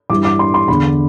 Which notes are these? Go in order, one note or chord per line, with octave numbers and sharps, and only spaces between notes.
G2 E3 D6
D6
C6
C6
E2 D3 B5